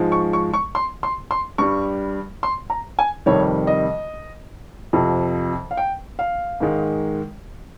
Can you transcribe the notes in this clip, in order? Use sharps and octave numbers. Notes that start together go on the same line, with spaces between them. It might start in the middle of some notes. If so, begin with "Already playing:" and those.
Already playing: G#2 F3 G#3
C#6
C#6
C#6
C6
C6
C6
G2 G3 C#6
C6
A#5
G#5
F2 C3 D#3 G3 C#5
D#5
F2 C3 F3
F5
G5
F5
G#2 D#3 G#3